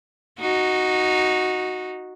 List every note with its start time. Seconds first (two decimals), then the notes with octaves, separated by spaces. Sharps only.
0.39 D#4 F#4